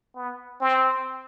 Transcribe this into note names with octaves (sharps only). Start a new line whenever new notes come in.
B3
C4